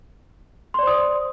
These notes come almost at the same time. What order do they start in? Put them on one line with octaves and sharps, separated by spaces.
C6 D5 C5 D#6